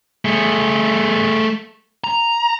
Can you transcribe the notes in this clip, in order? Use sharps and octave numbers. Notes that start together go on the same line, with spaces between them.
A3 G#4
A#5